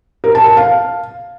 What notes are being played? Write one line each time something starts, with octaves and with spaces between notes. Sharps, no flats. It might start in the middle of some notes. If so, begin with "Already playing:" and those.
A#4
A5
A5
F5